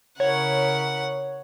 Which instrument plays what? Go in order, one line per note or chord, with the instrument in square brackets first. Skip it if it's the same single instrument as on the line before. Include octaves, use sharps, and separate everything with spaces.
[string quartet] C#3 E4 A#4 [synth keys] C#5 [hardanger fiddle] F#5